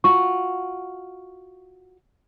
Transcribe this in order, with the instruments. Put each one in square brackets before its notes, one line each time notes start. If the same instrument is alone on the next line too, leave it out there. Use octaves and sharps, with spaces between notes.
[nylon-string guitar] F4 F#4 [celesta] C#6